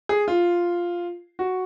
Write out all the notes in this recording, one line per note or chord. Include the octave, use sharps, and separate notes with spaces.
G#4
F4
F#4